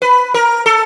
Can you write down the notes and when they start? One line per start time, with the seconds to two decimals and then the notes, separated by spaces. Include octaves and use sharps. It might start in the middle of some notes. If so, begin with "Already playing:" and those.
0.02 B4
0.34 A#4
0.66 A4